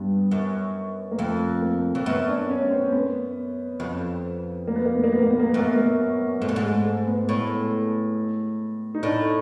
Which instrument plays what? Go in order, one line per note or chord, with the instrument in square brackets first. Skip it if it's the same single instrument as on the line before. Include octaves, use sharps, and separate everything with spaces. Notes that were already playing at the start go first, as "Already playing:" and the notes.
Already playing: [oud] G2 [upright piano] B3
[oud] F#2
[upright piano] A#3
[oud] F2 [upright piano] A3
[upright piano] A#3
[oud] F2
[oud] F#2 [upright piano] B3
[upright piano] D4
C#4
C#4
C4
B3
[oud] F2
[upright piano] A#3
B3
A#3
B3
A#3
B3
A#3
B3
A#3
B3
[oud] F#2 [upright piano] A#3
[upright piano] B3
A#3
[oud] G#2 [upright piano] A3
[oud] G2
G#2
[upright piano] G#3
A3
B3
[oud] A2
[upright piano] D#4
[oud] A2 [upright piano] D4